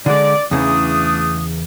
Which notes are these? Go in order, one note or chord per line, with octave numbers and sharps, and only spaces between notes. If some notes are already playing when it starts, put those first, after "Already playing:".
D3 G#3 D5
E2 C#3 E3 A3 D4 D#6